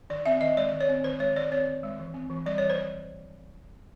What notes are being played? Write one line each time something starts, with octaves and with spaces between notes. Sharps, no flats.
D#3 D5
C4 E5
D#3 D#5
G#3 D5
D#3
C#5
C4
D#3 C5
G#3 C#5
D#3 D5
C4 C#5
D#3
G#3
E3
C4
E3
G3 D5
C#5
E3
C5